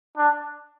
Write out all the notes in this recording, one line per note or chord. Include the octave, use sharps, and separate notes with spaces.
D4